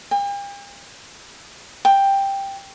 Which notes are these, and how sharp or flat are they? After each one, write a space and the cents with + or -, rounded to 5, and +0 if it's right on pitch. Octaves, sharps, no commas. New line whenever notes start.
G5 +45
G5 +5